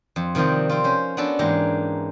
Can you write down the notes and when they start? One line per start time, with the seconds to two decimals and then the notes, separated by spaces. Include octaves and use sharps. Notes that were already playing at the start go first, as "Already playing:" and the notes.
0.16 F2
0.35 C3 D#3 F3 G3 C4
0.70 C4 F4
0.84 C#4 C5
1.17 B3 C#4 D4 F#4 A4 B4
1.39 G#2 E3 G#3 A#3 G4 A#5